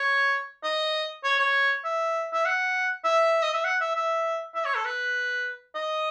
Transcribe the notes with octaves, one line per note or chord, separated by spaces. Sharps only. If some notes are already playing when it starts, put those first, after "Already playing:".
Already playing: C#5
D#5
C#5
C#5
E5
E5
F#5
E5
D#5
E5
F#5
E5
E5
E5
C#5
A4
B4
D#5